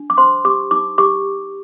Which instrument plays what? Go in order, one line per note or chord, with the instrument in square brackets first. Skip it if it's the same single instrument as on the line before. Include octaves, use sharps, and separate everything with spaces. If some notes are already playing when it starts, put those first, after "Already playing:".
Already playing: [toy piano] D4
D6
C5 C6
G4 D6
D#4 D6
G4 D6